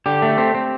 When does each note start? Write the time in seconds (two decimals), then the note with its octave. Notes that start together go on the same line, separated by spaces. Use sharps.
0.06 D3 G4
0.22 A3
0.38 C4
0.54 C4